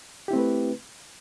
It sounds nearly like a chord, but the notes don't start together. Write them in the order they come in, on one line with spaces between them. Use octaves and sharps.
G4 E4 C4 A3 B4